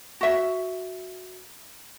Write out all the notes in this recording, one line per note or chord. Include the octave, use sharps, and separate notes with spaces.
F#4 E5